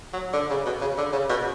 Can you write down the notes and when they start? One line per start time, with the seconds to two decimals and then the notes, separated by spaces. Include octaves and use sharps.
0.13 F#3
0.33 D3
0.50 C#3
0.66 B2
0.81 C#3
0.98 D3
1.13 C#3
1.30 B2